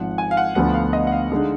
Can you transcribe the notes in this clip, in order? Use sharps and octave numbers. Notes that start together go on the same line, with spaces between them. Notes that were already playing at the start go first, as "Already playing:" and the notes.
Already playing: G#1 G#2 F3 F#5
G#5
F5
F#5
D2 D3 F3 B3 F4 F#5
F5
D#5
F#5
F5
D3 G#3 D#4